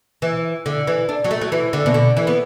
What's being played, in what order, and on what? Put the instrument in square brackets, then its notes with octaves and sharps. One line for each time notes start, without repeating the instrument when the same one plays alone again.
[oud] E3
D3
E3
D4
F#3
A3
F#3
E3
D3
B2
D3
E3
B3